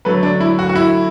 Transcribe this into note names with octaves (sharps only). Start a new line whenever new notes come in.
D3 F#3 A3 B4
D4
E4
F#4
F#4
E4